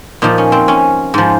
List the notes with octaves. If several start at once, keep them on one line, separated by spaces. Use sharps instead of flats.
A#2 F3 D#4
C#4
C4
C#4
G#2 F3